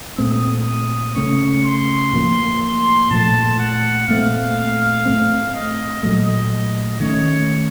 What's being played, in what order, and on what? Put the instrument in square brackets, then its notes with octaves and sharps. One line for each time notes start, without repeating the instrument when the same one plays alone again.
[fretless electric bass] A#2 A3 C4 [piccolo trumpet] D#6
[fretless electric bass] C#3 A3 C#4 [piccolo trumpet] C#6
[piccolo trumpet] C6
[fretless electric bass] A2 F3 A#3
[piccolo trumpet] C6
[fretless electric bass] A#2 F3 A3 [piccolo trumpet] A5
[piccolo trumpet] F#5
[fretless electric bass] A#2 A3 C4 [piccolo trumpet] F5
[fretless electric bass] A2 A3 C4
[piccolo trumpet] D#5
[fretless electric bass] A#2 F#3 A3 [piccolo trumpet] D#5
[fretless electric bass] D#3 A3 C#4 [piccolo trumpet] C#5